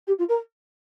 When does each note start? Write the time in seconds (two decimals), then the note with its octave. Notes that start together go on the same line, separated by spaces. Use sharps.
0.07 G4
0.18 F4
0.28 A#4